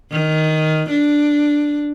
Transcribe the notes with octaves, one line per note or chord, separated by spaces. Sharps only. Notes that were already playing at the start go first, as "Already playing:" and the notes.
D#3
D4